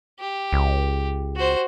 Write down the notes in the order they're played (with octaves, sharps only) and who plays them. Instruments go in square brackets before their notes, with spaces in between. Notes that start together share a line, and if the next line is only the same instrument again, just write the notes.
[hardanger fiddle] G4
[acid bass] C#2
[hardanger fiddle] F#4 C5